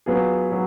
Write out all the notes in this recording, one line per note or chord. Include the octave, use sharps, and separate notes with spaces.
F#3 B3 F4 G#4
F#3